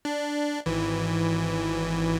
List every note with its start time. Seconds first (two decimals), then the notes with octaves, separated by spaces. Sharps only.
0.05 D4
0.66 G#1 E3